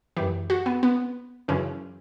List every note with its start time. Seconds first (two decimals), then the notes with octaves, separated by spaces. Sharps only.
0.17 F#2 E3 G4
0.50 F#4
0.66 B3
0.83 B3
1.48 F#2 C#3 E3 C#4